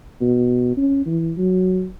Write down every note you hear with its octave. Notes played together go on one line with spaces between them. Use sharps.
B2
C#4
E3
F#3